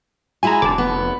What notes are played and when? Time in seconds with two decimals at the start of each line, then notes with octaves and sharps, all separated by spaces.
0.43 G#3 E4 F#4 G#5 A#5
0.62 F1 D3 A5 D6
0.78 B3